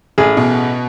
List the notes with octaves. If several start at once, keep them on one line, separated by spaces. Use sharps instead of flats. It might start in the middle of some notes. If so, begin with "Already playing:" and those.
A1 G#4
B2